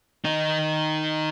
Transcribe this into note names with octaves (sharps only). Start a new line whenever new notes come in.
D#3 D#4